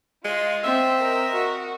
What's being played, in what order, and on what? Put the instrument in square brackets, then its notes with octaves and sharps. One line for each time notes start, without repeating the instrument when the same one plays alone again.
[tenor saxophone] G#3 [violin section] F4 D#5
[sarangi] C4 [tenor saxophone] E5
[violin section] A#4 D#5
[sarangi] F#4